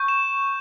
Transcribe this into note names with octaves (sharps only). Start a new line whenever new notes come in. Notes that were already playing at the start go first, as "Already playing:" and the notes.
Already playing: C#6 G6
E7